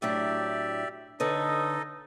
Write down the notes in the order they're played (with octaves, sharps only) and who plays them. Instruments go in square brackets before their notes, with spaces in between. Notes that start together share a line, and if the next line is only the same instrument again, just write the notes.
[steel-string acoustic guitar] A2 F#3 D4 [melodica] G4 D5 E5
[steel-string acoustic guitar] D3 B4 C#5 [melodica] D#4 A4 D#5